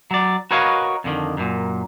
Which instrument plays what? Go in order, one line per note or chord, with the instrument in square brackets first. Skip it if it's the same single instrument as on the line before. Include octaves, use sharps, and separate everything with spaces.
[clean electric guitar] F#3 D5
F#4 A#4 B4 C#5 D#5 F5
F2 D3 D#3
F#2 A#2